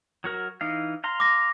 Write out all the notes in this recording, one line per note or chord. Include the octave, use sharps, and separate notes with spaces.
F#3 F#4 A#4
E3 D#4 F5
F5 A#5 C6
D6 A#6